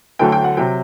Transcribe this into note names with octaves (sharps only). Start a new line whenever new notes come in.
D2 D3 F#3 A3 G5
G5
F#5
C3 F#3 G5